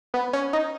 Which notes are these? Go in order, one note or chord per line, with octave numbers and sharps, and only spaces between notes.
B3
C#4
D#4